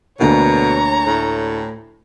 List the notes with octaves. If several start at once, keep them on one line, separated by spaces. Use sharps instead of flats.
D2 B2 D3 A#3 C#5 A#5
A2